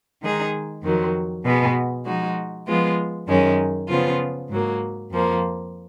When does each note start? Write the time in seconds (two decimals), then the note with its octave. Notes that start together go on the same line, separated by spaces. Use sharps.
0.21 D#3 G#3 D#4 G#4
0.82 F2 D#3 F#3
1.44 B2 G#3 B3
2.05 F3 G#3 D#4 F#4
2.66 F3 G#3 B3 F4
3.27 F#2 D#3 G#3 C#4
3.88 C#3 F3 B3 F4
4.49 G#2 F#3 A#3
5.11 F2 F3 A#3